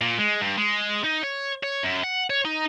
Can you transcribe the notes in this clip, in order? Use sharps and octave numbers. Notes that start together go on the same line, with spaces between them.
A#2
G#3
G2
G#3
D#4
C#5
C#5
F#2
F#5
C#5
D#4